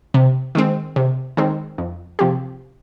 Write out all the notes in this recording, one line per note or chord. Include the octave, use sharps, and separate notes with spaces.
C3
D#3 G#3 C4
C3
D#3 G#3 C4
F2
C3 F3 C4 G4